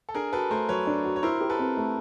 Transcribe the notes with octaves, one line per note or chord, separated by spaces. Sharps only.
A4
D4 G#4 A#4
F#4 A4 B4
A3 A#4 C5
F#3 B4 C#5
D4
F#4
C#5
E4 A#4 C5
G4
A4 B4
C4
A3